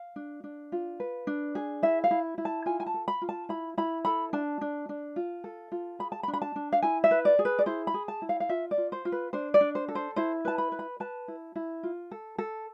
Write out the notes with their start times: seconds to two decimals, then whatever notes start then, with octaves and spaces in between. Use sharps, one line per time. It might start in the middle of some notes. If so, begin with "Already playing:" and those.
Already playing: F5
0.16 D4
0.44 D4
0.72 F4
1.00 B4
1.27 D4
1.55 G#4
1.83 E4 E5
2.04 F5
2.11 E4
2.38 E4
2.45 A5
2.66 F4 G#5
2.80 G#5
2.86 A5
2.94 A4
3.08 B5
3.22 F4
3.29 A5
3.49 E4 B5
3.78 E4 B5
4.05 A4 B5
4.33 D4 A5
4.61 D4
4.89 D4
5.16 F4
5.44 A4
5.72 F4
5.99 G#4 B5
6.12 A5
6.23 B5
6.28 D4
6.34 B5
6.42 A5
6.56 D4
6.73 F5
6.82 E4 G#5
7.04 E5
7.11 B4
7.25 D5
7.39 G#4
7.45 B4
7.59 D5
7.66 E4 C5
7.87 B5
7.94 G#4
8.08 A5
8.22 E4
8.29 F5
8.40 F5
8.49 F4 E5
8.71 D5
8.78 F4
8.92 C5
9.05 F4
9.12 B4
9.33 D4 C5
9.54 D5
9.61 D4
9.75 C5
9.88 A4
9.95 C5
10.16 E4 C5
10.45 B4 A5
10.58 B5
10.72 B4
10.79 B5
11.00 B4 A5
11.28 E4
11.56 E4
11.83 F4
12.12 A4
12.38 A4